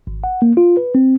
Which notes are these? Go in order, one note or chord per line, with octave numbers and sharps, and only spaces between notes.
G#1
F#5
A#3
F4
B4
C4